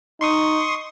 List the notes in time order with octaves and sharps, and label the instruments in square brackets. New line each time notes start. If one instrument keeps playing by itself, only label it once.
[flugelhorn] D#4 [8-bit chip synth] C6 C#6 D#6